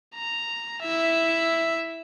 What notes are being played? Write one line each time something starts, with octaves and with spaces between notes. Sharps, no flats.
A#5
E4 E5